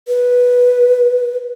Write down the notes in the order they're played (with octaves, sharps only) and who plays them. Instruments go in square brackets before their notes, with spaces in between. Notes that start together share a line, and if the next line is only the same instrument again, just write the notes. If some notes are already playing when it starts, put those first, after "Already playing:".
[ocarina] B4